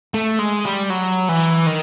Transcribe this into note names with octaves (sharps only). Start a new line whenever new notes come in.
A3
G#3
G3
F#3
E3
D#3